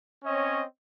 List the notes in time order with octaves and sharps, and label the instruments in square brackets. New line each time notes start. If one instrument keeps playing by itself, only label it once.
[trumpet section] C4 C#4 C#5 D#5